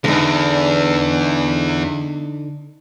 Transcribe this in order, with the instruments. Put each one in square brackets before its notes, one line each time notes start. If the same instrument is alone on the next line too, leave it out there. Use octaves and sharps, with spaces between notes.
[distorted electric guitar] E2 [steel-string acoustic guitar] D3 D#4